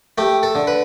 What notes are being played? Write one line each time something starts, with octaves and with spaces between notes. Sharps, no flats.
A3 G4
A4
D3
B4